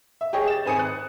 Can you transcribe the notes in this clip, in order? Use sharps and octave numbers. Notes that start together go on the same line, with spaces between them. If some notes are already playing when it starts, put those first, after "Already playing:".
E5
G4 G#4 C#5 D#5
A6 E7
G#1 C5 G#5 D#6 C#7
F#6